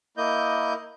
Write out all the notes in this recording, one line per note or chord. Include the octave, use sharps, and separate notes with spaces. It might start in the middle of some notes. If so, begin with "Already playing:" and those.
A#3 E4 D#5 G6